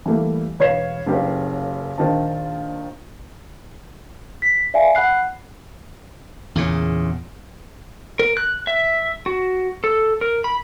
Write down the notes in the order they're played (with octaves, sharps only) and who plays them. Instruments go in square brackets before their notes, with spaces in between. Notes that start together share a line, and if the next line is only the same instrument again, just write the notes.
[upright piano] E3 G3 A3 A#3
E1 B4 C#5 F5 C7 E7
F#1 F#2 G4 B4 F5
A#1 D#3 F4 C5 A5
[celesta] B6
D5 E5 F5 G#5
F#5 B5 F#6 C7
[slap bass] E2 A#2 C#3
[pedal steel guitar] A#4
F#6
E5
F#4
A4
A#4
B5